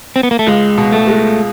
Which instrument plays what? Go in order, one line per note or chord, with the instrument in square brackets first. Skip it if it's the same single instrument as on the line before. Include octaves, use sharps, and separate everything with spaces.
[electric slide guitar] C4
B3
A#3
A3
[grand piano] C#2 [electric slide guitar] G#3
[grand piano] B2
[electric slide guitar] A3
[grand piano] G#3